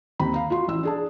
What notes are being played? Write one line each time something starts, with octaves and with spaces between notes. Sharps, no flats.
D#2 C4 A#5 B5
F5 A#5
F4 F#4 C6
A1 E4 E6
D4 G#4 A5